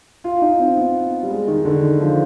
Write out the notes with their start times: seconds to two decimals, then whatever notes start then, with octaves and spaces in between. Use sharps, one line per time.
0.24 F4
0.42 D#4
0.60 C4
0.77 B3
1.23 G3
1.31 G#3
1.47 D#3
1.65 D3
1.83 D#3
2.01 F3